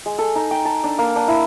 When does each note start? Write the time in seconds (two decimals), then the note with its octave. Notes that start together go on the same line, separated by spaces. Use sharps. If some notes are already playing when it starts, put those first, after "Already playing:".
0.06 G#3
0.18 A4
0.35 D#4
0.51 G5
0.65 A5
0.84 D4
0.98 A#3
1.16 D4
1.28 E4